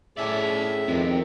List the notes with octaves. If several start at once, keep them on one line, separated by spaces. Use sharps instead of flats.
A2 C#4 G#4 D5 E5
F2 C3 D#3